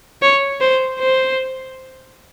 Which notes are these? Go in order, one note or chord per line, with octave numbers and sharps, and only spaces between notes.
C#5
C5
C5